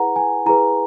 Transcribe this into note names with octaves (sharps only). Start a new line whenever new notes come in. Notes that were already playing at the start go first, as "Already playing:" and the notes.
Already playing: E4 G#4 B4 F#5 A#5
G#5
E4 G#4 B4 A#5